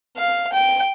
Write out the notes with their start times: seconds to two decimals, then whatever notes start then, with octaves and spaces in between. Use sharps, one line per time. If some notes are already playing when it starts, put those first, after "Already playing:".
0.17 F5
0.53 G5